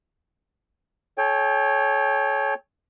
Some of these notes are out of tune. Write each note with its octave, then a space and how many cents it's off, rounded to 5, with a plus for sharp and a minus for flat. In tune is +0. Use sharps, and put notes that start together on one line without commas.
A4 -35 C#5 +0 G5 +25